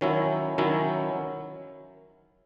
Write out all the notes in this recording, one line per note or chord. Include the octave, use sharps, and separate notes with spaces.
D#3 F#3 C#4 E4
D#3 F#3 C#4 E4